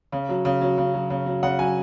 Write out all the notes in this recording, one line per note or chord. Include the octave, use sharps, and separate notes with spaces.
C#3
F#3
C#3
F#3
C#3
F#3
C#3
F#3
C#3 F#5
F#3 G#5